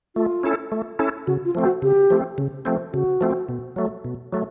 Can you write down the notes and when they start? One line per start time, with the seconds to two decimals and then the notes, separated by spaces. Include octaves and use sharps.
0.16 A3 F4
0.43 C#4 E4 A4
0.72 A3
0.99 C#4 E4 A4
1.27 C#3 F#4
1.45 F4
1.55 F3 A3 C4
1.64 F#4
1.82 C#3 G4
2.10 F3 A3 C4
2.38 C#3
2.65 F3 A3 C4
2.93 C#3 F#4
3.21 F3 A3 C4
3.49 B2
3.76 F#3 A3
4.04 B2
4.32 F#3 A3